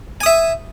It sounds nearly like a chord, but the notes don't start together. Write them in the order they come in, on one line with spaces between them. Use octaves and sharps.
G#5 D#6 E5